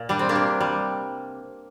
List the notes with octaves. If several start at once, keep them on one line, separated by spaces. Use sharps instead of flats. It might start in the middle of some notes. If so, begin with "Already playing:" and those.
Already playing: A#2
G3 D4
C4
A#3 D4
C3
G3